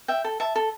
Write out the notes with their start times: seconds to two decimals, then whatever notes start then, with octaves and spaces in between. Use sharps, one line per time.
0.08 E5 G5
0.24 A4
0.40 E5 A5
0.56 A4